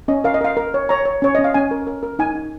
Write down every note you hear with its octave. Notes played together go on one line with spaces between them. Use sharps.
C#4 D#5
A#4 F5
D#5
A#4 F5
A#4
C#5
C#5 A#5
C#5
C#4 C#5
C#4 D#5
F5
C#4 G#5
A#4
A#4
A#4
D#4 G#5
D#4